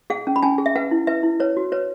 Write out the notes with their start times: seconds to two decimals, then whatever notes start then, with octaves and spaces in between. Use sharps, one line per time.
0.10 G#4 F#5
0.27 C#4
0.36 B5
0.43 C#4 G#5
0.58 G#4
0.66 E5
0.76 B4 F#5
0.91 E4
1.07 B4 E5
1.23 E4
1.40 B4 C#5
1.57 F#4
1.72 B4 C#5